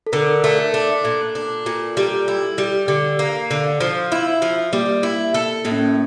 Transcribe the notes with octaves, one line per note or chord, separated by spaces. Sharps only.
A4
D3 A#4
A3
A4
D4
A#2
D4
A#2
G3
E4
G3
D3
A#3
D3
F3
E4
F3
G3 A#3
E4
A4
A2 A#3
C#4
A#3